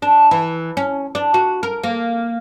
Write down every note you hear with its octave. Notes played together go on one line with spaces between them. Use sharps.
D4
E3
C#4
D4
F#4
A#4
A#3